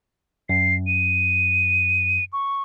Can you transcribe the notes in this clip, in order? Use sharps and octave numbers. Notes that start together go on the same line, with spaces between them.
F#2 C7
D#7
C#6